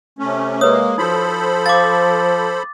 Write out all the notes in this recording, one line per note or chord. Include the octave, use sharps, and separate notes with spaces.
C3 A3 C#4
G#3 A#3 B4 C#5 D#6
F3 D#4 F#4 A4 C5 B5
F5 D6 A6